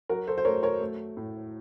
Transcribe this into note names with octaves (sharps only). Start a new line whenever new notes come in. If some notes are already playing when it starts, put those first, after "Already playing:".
F#3 F#4 A#4
A4 C5
C5
A3 A#4 C#5
A#4 C#5
A3
A2